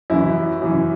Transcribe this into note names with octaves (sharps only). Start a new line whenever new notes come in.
F#2 E3 E4
F#2 E3